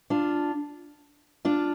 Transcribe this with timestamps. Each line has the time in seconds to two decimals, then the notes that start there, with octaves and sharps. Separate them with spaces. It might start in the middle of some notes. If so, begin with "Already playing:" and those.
0.10 D4 F4
1.45 D4 F4